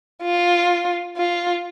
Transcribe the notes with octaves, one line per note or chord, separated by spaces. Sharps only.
F4
F4